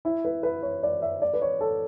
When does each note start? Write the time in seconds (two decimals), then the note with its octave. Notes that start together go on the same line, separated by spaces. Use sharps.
0.05 E4
0.25 B4
0.43 B4
0.63 C#5
0.83 D5
1.02 E5
1.22 D5
1.34 B4
1.41 C#5
1.61 A4